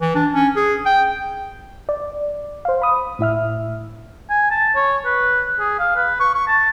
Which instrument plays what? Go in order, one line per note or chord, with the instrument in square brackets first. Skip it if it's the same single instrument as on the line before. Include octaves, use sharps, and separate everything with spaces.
[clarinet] E3
D4
C#4
G#4
G5
[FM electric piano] D5
C5 F5
B5 D#6
A2 E4 E5 F6
[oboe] G#5
A5
C#5
B4
G#4
F5
B4
C#6
C#6
A5